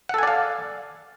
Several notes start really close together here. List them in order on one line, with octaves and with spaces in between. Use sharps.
F#5 A4 G#5 D5 F5